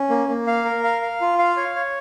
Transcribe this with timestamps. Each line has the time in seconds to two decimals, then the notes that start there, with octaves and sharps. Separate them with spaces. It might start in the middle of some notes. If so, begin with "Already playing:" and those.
Already playing: C#4
0.10 A#3
0.29 A#3
0.47 F5
0.65 A#4
0.84 F5
1.02 F5
1.21 F4
1.39 F5
1.57 C#5
1.75 C#5